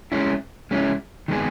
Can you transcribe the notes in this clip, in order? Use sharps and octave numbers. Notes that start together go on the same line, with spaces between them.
G#3 C#4 E4
G#3 C#4 E4
D#3 G#3 B3 D#4 G#4